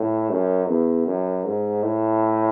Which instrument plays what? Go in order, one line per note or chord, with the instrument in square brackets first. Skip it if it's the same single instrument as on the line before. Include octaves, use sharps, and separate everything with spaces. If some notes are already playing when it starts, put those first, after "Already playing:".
Already playing: [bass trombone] A2
F#2
E2
F#2
G#2
A2